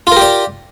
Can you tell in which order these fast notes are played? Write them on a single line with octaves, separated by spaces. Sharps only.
F4 A#4 G4 D5